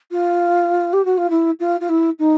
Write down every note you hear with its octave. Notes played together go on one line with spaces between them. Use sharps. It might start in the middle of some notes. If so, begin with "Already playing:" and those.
F4
G4
F#4
F4
E4
F4
F4
E4
D#4